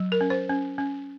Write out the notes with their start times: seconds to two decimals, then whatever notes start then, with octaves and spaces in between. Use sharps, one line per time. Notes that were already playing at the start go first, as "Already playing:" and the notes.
Already playing: F#3
0.12 A#4
0.21 C#4
0.30 C5
0.49 C#4
0.78 C#4